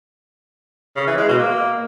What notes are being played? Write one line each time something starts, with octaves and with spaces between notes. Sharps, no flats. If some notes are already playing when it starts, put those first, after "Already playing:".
C#3
E3
G#3
B2
A#3